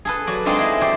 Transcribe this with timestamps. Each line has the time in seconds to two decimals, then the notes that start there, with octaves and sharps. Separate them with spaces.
0.05 G#4 A4 B4
0.27 F#3 F#4 D5
0.45 G#3 C4 D4 D#4 F4 A4
0.58 E4 G#4
0.81 F#4 G4 C5 D5